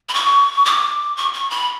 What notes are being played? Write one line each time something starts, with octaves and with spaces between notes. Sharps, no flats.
B5
C#6
D6
C#6
C#6
B5